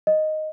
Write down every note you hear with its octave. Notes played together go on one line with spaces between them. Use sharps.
D#5